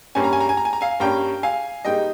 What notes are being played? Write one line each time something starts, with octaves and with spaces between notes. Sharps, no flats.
G2 G3 A#3 C#4 G#5
A#5
G#5
A#5
G#5
A#5
G#5
A#5
F5 G#5
G2 G3 A#3 C#4 G5 A#5
F5 G#5
G#2 G3 A#3 D#4 D#5 G5